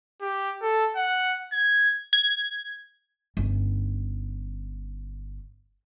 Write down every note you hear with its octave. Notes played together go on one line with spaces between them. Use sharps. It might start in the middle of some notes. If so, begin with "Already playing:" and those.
G4
A4
F#5
G#6
G#6
G1 C#4